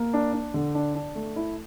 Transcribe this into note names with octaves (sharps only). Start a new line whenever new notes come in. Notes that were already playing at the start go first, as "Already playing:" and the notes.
Already playing: A#3
D4
D4
D3
D4
D4
A3
E4